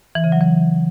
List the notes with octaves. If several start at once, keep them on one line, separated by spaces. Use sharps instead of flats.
E3
C#3
F#3
E3